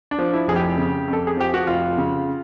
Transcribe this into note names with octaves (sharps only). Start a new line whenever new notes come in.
D4
F3
E4
F1 G#4
G4
C#3
F2
A4
G#4
F3 G4
F#4
F1 F4
C#3